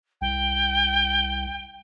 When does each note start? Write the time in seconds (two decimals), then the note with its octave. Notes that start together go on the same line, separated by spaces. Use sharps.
0.21 C2 G5